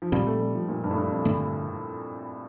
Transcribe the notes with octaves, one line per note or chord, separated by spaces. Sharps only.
F3
A#2 F3 G3 C4
A3
G3
F3
A#2
G2
A2
G2
F2
G2 D3 A3 D4